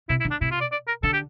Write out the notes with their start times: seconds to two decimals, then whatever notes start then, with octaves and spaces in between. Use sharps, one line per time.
0.09 C3 E4
0.20 E4
0.25 D3
0.31 D4
0.41 C3 E4
0.51 F4
0.61 D5
0.72 D5
0.88 A#4
1.03 D3 A4
1.13 G4